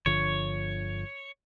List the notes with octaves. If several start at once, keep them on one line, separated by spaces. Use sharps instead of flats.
G1 D3 F3 C#5